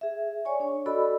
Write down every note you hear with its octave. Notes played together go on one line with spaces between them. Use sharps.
G#4 E5
C#5 D5 G#5 C#6
D4 C#5
F#4 A4 D5 D#5 B5 E6